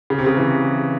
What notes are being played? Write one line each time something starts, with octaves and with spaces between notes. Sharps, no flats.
C#3
C3
C#3
E3